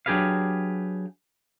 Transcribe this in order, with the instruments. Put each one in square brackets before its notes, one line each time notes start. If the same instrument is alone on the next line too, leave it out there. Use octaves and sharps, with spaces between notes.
[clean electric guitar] F#3 D4 G4 G#4 B4 F5